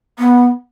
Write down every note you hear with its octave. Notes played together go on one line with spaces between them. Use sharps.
B3